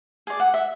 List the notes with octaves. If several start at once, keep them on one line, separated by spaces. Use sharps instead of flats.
G#4 D5 G#5
F#5
E5